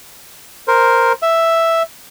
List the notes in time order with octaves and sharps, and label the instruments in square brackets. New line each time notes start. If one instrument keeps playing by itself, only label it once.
[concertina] A#4 C5
E5